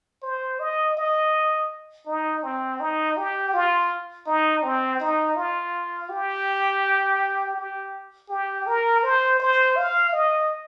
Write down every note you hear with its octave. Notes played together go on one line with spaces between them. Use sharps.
C5
D#5
D#5
D#4
C4
D#4
G4
F4
D#4
C4
D#4
F4
G4
G4
G4
A#4
C5
C5
F5
D#5